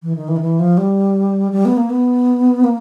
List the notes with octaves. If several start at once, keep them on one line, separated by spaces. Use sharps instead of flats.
E3
D#3
E3
D#3
E3
F3
G3
G3
B3
A#3
B3
A#3